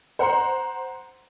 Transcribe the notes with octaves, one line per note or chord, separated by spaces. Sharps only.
C5 F#5 A#5 C6